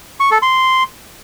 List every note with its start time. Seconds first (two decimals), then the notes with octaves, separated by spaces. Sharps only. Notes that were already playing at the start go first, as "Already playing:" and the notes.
0.20 C#6
0.31 A4
0.42 C6